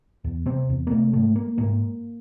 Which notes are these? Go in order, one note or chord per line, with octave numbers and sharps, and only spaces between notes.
E2
C3 C4
E2
A#3
C3 A3
G#2 A3
A#3
G#2 A#3